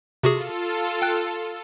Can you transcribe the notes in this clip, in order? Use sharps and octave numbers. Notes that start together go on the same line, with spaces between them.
C3 F4 F#4 G#4 A4
G5 F#6